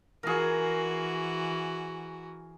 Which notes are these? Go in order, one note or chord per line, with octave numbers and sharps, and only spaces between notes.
E3 F#4 G#4 A#4